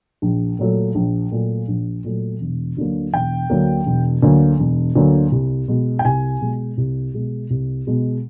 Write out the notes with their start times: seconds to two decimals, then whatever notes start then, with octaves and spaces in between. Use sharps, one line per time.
0.22 A#1
0.59 A#2 F#3 A3
0.95 A#1
1.32 A#2 F#3 A3
1.68 A#1
2.04 A#2 F#3 A3
2.41 E1
2.77 D2 D3 F#3 A#3
3.13 E1 G5
3.50 D2 D3 F#3 A#3
3.86 E1
4.22 D2 D3 F#3 A#3
4.59 E1
4.96 D2 D3 F#3 A#3
5.32 C2
5.68 B2 G#3
5.99 G5
6.05 C2 G#5
6.41 B2 G#3
6.77 C2
7.14 B2 G#3
7.50 C2
7.87 B2 G#3